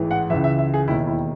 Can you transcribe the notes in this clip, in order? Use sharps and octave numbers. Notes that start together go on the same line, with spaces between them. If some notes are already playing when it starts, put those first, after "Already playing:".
Already playing: A1 G#2 E3
F#5
C#2 C#3 E3 E5
E5
E5
G#4
E1 D#2 D#3 E4
E4